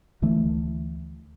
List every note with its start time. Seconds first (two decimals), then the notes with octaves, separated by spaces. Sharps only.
0.22 D2 D3 E3 A3